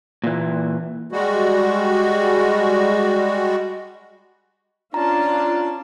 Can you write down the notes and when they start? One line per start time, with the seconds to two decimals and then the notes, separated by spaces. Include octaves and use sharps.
0.24 A#2 E3
1.12 G3 G#3 F#4
4.94 C#4 D4 F4 A5 A#5